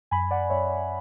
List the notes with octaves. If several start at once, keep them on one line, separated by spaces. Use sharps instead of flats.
F#2 G#5 B5
D5 F#5
F#2 C#5 E5
C#5